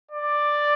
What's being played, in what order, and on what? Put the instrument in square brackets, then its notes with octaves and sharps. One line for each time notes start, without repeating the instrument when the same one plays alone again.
[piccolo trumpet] D5